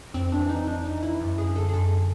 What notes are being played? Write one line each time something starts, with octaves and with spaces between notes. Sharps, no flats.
F2 C4
D4
E3
D#4
F2 D4
D#4
E3
E4
F#2
G#4
D3
A4
G#4
F#2 A4